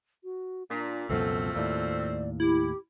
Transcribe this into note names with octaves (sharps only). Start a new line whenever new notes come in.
F#4
A#2 D4
C#2 F#2 B2 F3 A3 C4 A4
D#2 A2 D5
E4 G4